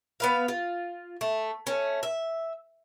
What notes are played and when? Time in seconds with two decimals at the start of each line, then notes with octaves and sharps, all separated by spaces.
0.20 B3 B4 F5
0.48 F4
1.21 A3
1.67 A3 C#4
2.03 E5